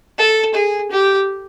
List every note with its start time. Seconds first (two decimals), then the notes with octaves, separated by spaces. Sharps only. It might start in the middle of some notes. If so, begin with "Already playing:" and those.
0.18 A4
0.54 G#4
0.91 G4